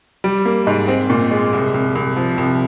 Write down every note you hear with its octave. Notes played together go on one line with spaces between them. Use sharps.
G3
A#3
G#2
C4
A#2
G#3
C2
C2
C2
F3
C2